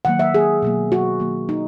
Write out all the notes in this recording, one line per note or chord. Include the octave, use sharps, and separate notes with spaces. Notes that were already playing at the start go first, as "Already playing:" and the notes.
D#3 F#3 A#3 F#5
E5
G#4
B2 F#3 A#3
F#4
D#3 F#3 A#3
D#4